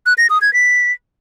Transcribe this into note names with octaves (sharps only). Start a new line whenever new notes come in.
F#6
A#6
D#6
G#6
B6